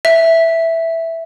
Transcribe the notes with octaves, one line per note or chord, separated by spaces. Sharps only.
E5